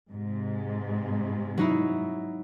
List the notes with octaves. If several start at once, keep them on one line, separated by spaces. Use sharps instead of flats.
G#2 C3 G#3
F#3 D#4 E4